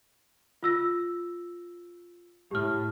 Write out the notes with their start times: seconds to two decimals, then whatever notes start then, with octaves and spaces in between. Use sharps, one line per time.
0.63 F4 E6 A#6
2.51 A2 G4 F6